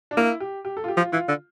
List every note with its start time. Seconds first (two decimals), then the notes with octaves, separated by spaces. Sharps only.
0.11 D4
0.17 A#3 E4
0.40 G4
0.65 G4
0.77 A4
0.84 F4
0.88 G4
0.97 F3
1.01 F4
1.12 E3 F4
1.29 D3